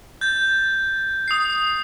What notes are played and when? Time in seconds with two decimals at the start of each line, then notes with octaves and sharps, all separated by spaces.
0.21 G6 A6
1.28 D#6 C7